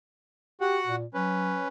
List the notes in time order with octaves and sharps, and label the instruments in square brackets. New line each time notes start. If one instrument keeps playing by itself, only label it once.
[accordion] F#4 F#5 [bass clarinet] G4
[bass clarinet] A#2
[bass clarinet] F#3 [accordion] C#4 B4